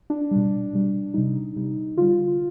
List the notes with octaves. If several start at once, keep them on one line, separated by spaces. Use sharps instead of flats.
D4
B2 G3
B2 G3
C3 G3 D#4
C3 G3
D3 G3 F4